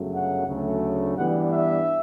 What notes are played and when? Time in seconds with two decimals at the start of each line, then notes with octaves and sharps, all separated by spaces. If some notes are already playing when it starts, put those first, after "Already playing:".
Already playing: G1 F#2 C#3 F#3 A3
0.13 F#5
0.47 D2 C#3 F#3 A3
1.16 G2 E3 G3 B3 D4 F#5
1.51 E5